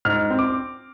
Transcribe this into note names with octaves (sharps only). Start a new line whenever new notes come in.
G#2 F6
C4
D6